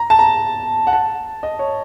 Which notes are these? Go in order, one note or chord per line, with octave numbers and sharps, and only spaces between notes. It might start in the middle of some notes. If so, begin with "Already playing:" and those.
Already playing: A#5
A5
A#5
F#5
A5
D#5
C#5